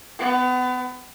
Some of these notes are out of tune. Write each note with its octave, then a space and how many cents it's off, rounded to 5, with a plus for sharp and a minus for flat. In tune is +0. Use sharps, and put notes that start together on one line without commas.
B3 +30